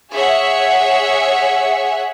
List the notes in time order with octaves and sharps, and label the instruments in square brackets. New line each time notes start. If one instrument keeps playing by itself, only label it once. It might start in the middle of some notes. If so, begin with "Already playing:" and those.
[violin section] G#4 C#5 E5 F#5